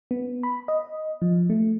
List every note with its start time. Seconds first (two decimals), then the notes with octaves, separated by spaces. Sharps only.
0.11 B3
0.43 B5
0.68 D#5
1.22 F3
1.50 A3